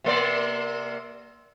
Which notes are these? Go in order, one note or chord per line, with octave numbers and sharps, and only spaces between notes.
C3 A#3 D5